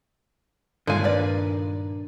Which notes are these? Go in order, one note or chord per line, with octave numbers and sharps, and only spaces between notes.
G2 A#2 D3 D#3 G#3 F4 F5 G#5
D4 A#4 B4 D5